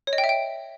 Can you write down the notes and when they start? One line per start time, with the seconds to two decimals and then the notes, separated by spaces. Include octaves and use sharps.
0.07 C#5
0.13 D#5
0.18 G5
0.24 E5
0.29 G5